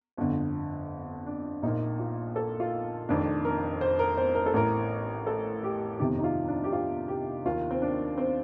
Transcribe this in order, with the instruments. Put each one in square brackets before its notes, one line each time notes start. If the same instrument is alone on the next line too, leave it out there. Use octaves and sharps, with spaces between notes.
[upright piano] G1 F2 D3
D4
A#1 A#2 D#4
F4
A4
F4
F1 F2 D#3 D4
A#4
C5
A#4
C5
A#4
A4
A1 A2 A#4
A4
G4
G1 F2 C3 D#3 G4
D#4
F4
D4
G4
F4
G4
D#2 D#3 F4
C4
D4
C4